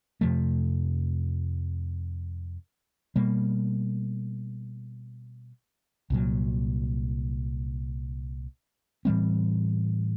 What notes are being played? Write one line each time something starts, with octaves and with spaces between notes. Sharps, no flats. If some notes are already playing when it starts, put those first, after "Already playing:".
F2 C3 F3 A3
B2 G3 A#3
C2 A#2 F#3
A2 E3 G3 C4